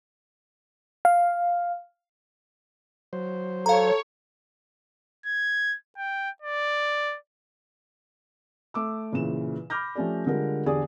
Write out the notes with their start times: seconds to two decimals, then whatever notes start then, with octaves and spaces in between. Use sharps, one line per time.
1.05 F5
3.13 F#3 C5
3.66 A4 C#5 F5 A#5
5.26 G#6
5.97 G5
6.42 D5
8.74 A3 D6 E6
9.12 A#2 C#3 E3 E7
9.70 B5 D6 F6 G6 A#6
9.95 F3 A3 C#4 G4 D5
10.26 D3 G3 G#3 F4 A#4
10.66 E2 D3 G4 G#4 D5 D#6